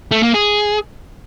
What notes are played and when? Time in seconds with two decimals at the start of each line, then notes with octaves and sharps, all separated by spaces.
0.11 A3
0.23 A#3
0.34 G#4